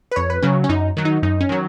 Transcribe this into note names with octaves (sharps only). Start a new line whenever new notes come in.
B4
F2 C#5
B4
C#3 F#3 C#4
C#4
F#2 D#4
D#3 F#3
D#4
F#2 D#4
C#4
D#3 F#3